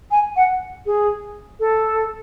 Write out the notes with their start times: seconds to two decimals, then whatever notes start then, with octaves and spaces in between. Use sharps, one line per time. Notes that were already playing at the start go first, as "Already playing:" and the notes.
0.11 G#5
0.36 F#5
0.86 G#4
1.59 A4